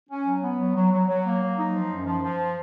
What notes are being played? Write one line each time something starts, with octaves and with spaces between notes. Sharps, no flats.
C#4
F#3
B3
F#3
F#3
F#3
F#3
A#3
F#3
D#4
F3
F#2
F3
F3